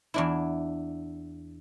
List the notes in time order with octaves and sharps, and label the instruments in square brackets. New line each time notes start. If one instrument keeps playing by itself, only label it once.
[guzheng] E2 D4 E4